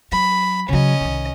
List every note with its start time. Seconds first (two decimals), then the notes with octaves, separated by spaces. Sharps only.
0.12 F#3 B5
0.69 C#3 F#3 C#4 D#5
1.01 C2 D#3